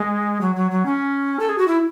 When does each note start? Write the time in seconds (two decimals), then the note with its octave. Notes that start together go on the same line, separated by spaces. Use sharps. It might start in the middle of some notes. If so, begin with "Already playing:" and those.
Already playing: G#3
0.41 F#3
0.56 F#3
0.71 F#3
0.86 C#4
1.40 A4
1.49 G#4
1.58 F#4
1.68 E4